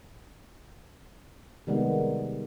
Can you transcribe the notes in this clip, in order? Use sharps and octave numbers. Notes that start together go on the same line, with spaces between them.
C3 D#3 G3 G#3 B3